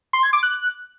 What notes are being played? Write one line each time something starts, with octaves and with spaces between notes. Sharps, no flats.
C6
G#6
D6
F#6